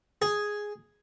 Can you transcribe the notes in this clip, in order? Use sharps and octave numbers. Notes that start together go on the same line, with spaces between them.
G#4